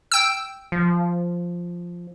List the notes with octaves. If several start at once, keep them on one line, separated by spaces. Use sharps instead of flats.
G5 E6
F3